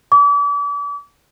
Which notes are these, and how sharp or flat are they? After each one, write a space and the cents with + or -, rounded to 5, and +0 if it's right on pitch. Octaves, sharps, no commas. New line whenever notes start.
D6 -40